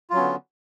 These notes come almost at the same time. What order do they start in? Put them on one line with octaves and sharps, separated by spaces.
F4 F#3 C#4 B3 D3